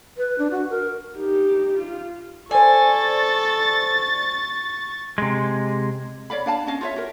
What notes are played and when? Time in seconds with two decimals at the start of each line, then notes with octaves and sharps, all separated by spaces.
0.18 B4
0.38 D4
0.51 F#4
0.70 A#4
1.17 D#4 G4
1.78 F4
2.51 A4 C5 D5 G#5 C#6 A6
5.18 C3 G#3
6.30 C#5 D5 F5 B5
6.46 D4 F5 A5
6.67 C#4 D#5 F5
6.81 F4 C#5 E5
6.96 F#4 A#4